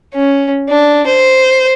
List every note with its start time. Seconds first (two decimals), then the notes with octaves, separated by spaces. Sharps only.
0.14 C#4
0.69 D4
1.07 C5